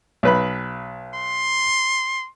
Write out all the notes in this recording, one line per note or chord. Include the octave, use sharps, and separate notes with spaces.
B1 B4 B5
C6